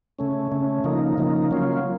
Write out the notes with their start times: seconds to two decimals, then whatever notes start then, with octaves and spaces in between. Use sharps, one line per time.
0.19 C#3 A3 C#4
0.52 C#3 A3 C#4
0.84 C#3 F3 A#3 D#4
1.17 C#3 F3 A#3 D#4
1.51 F#3 A#3 C#4 F4